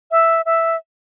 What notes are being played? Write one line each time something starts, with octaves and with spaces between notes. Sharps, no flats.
E5
E5